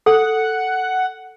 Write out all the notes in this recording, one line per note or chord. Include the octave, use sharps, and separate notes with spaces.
A4 F#5